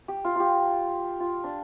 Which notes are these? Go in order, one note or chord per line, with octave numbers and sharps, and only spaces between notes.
G4
F4
F4 G4
F4
D4